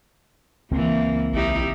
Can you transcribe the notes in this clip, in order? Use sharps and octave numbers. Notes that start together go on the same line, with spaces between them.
C#2 E3 A#3 C4
A#1 D#4 E4 G4